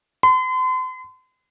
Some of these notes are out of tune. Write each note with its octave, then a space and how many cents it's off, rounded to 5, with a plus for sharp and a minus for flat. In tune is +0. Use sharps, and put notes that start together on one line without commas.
C6 -40